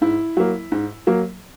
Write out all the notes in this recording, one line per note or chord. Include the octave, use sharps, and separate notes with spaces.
G#2 E4
F#3 A#3
G#2
F#3 A#3